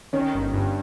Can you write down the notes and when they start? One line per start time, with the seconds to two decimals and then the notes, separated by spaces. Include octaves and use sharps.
0.13 D#3 C#4
0.34 G1
0.54 G2